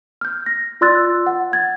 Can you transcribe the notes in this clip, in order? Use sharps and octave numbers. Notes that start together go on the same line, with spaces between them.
F6 G6
A#6
F4 D5 C6 E6 F#6 A6
F#5
F#5 G#6 A6